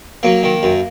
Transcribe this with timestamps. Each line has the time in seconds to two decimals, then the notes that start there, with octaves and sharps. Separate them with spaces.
0.23 F#3 A#3
0.43 D#3
0.63 F#2